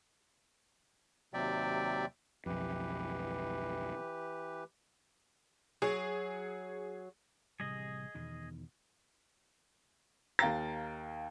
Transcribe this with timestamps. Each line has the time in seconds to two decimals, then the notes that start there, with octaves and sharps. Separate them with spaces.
1.34 D#2 C3 F#3 D5 E5 G5
2.46 B1 F2 E3 G4 B4
5.82 F#3 G#4
7.60 A1 C3 G3 G#4 D#5
8.15 E2 B2 D#3
10.39 D#2 F5 G5 A#5 A6